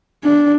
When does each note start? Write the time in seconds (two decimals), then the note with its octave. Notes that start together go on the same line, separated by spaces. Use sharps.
0.24 D4